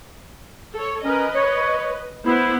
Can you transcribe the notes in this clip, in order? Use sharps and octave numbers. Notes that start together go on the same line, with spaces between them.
A4 C#5
C#4 A#4 B4 D#5
C#5
B3 E4 C5